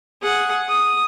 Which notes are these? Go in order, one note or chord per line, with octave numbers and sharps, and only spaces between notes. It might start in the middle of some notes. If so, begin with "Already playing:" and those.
G#4 F#5
D#6